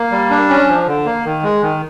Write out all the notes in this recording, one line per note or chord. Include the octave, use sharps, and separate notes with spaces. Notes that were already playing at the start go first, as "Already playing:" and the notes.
Already playing: A#3
G3
D4
C#4
F3
D3
A#3
D#3
G#3
D#3